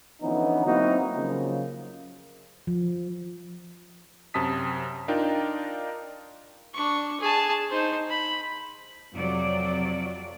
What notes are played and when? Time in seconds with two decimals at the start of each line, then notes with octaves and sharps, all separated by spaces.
0.22 D3 E3 F3 B3 C#4 D#4
0.65 F#3 A#3 C4 D#4 E4 F#4
1.14 C#3 F3 F#3 A#3
2.67 F3
4.34 F#2 C3 A5 D#6 B6
5.08 D4 D#4 F4 A#4 G5
6.74 D4 C#6
7.20 G#4 A5
7.69 D#4 C5
8.09 B5
9.14 F2 C3 F#3 D5